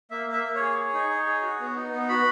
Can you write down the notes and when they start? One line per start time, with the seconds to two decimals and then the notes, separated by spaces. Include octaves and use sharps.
0.11 A#3 E5
0.27 A#3
0.32 E5
0.44 A#3
0.55 G#4 C#5
0.77 G#4
0.94 D#4
1.09 D#4
1.26 G#4
1.42 F#4
1.60 B3
1.76 D#4
1.92 B3
2.08 F#4 B5